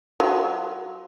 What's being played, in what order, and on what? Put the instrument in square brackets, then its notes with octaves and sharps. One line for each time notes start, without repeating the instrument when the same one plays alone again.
[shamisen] F#3 F4